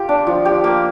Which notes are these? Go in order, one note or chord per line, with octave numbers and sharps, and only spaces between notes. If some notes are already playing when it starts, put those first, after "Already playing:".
Already playing: F4 G4
D4
F3
G4
A#3